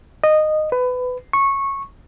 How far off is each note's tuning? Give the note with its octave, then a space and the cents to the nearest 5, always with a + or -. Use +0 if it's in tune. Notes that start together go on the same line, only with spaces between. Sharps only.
D#5 -15
B4 +20
C#6 -15